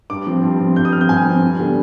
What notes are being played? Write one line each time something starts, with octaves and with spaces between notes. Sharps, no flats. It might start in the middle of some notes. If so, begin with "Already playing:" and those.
G2 D6
F3 C4
G2
F3 C4
G2 G6
D#6
F3 C4 F6
G6
G2 G#5
F3 C4
G2
D3 G3 B3 D4